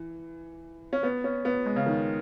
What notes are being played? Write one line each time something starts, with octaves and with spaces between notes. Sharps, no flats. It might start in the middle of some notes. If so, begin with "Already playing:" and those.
Already playing: E3
C#4
B3
C#4
B3
G#3
C#3
D#3